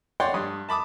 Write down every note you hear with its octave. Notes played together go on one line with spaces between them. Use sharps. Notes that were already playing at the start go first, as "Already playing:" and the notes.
C#5 D5 F#5 G5 C6
G2 D#6
A5 B5 D6 D#6